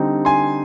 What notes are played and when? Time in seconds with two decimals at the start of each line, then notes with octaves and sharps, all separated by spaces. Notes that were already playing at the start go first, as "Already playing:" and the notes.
Already playing: D3 G3 C4 D#4
0.25 G#5 C6